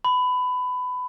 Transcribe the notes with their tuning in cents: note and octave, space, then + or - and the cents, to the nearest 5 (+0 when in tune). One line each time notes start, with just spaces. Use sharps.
B5 +20